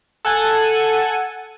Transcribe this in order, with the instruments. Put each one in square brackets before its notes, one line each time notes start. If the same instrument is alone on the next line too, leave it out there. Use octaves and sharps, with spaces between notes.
[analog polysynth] A4 F#5 G#5 D#7